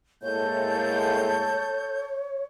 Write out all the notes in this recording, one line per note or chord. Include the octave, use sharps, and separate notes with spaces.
A2 G#3 A#3 A4 C#5 G6